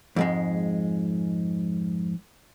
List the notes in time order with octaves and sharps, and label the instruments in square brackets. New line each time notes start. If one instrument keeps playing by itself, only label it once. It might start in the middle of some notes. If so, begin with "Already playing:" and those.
[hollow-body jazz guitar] F2 G#2 G#3